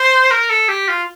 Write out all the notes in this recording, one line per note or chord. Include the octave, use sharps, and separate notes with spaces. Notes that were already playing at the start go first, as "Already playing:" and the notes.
Already playing: C5
A#4
A4
G4
F4